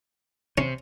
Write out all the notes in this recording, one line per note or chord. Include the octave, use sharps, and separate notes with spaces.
C3 C#4